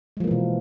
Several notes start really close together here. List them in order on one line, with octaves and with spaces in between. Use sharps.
G#3 F3 A#3 E3 B2